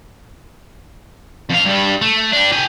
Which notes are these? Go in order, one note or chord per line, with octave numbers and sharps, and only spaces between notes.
F2 F5
G2 G3
A3
D4 G4
G4 G#5